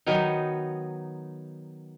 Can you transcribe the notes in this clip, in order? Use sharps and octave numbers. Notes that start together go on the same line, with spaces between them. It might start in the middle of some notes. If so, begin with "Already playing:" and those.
D#3 F#3 B3 D#4